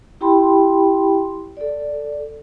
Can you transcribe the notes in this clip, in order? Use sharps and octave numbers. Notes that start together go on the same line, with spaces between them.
E4 G4 G5 B5 C6
A4 D5